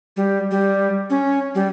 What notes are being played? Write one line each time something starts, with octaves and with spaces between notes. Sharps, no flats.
G3
G3
C#4
G3